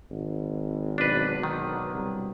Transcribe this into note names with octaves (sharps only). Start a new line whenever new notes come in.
G#1
B2 D3 F#3 D4 B4
D#3
C2